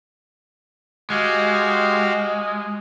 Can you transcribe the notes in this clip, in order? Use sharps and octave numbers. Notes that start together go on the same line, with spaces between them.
G#3 F#4 G4 F5